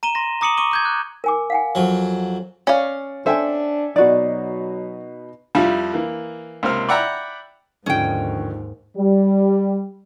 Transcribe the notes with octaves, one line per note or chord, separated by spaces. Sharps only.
A#5 D#7 E7 G7
C6 A#6
A#5 D6 D#6 C#7 D#7 F#7
C#6 D6 D#7 G7
D6 G6 G#6
F#6
A#4 G#5 D6
F5 F#5 G#5
F2 F#3
C#4 D5 F5
D4 A4 C5 E5 G5 G#5
B2 F#3 D#4 F#4 D5
F2 F3 G3 E4
E3 A#3
C#2 C3 A#3 C5 F5 F6
D5 E5 F#5 G5 A#5 B5
D#2 G#2 D3 F3 C#4 D#4 G5
G3